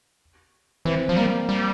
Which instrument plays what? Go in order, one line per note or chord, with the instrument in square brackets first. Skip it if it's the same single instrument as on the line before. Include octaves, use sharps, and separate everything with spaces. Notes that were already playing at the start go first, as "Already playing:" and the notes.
[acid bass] E3 [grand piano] C4
[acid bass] F3
[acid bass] G3 [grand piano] A#3
[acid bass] G3